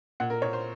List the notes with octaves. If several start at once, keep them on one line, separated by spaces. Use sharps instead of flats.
A#2 F#5
A#4
A#2 C#5
C5